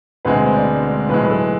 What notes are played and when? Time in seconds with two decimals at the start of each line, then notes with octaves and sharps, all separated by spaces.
0.25 E1 D2 D3 G#3 C4 B4
0.45 C5
0.56 D5
1.09 B1 A2 G#3 B4
1.25 B4
1.30 A4